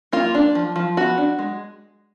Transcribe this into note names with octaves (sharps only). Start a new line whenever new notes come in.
A#3 F4
D4
F3
F3
B3 F#4
D4
G#3